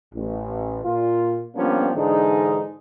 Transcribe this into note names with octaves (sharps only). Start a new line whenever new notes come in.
A1
A#2 F4
F3 G3 A#3 B3 C#4 D4
G#2 D3 E3 D4 D#4 G#4